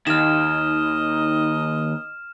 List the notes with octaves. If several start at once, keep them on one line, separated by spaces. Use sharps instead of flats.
D#2 D#4 D#5 F6 E7